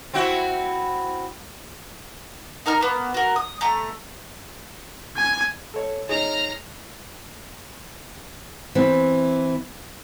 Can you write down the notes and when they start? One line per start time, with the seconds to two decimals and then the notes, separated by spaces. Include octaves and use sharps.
0.14 C4 E4 F#4
2.66 D#4 A#4 A#5 F6
2.81 A#3 B3
3.14 F#4 A#4
3.36 D#6
3.61 A3 A#5
5.17 G#5
5.74 A4 C#5
6.09 D#4 G#4 C#5 A#5 F6
8.75 E3 C4